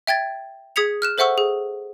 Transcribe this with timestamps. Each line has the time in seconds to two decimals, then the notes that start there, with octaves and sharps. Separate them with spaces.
0.07 E5 G5 G#6 A6
0.76 G#4 D#6 G#6 B6 C#7 F7
1.02 F6 F#6 E7
1.18 A4 C5 E5 F#5 C#6 E6
1.38 G#4